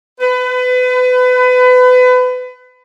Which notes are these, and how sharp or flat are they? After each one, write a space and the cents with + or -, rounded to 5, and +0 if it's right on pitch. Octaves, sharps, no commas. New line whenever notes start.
B4 +30